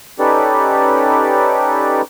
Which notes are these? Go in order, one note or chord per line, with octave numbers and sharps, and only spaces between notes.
C#4 D#4 G4 A4 B4 D5